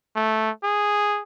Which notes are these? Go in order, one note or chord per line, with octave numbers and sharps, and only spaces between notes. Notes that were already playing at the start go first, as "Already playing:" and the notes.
A3
G#4